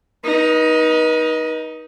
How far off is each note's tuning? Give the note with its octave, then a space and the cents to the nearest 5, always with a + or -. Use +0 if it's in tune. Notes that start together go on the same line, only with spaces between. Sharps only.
D#4 +10 B4 -40